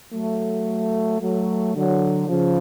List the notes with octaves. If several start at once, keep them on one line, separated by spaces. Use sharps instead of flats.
F#3 A3
F#3 A3
D3 F#3
C#3 F3